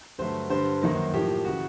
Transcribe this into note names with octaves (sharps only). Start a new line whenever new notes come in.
G2 D3 F#3 A3 C5
G2 D3 G3 C5
F#2 D#3 F#3 A#3
A2 F3 A#3 G4
C#3 E3 F#4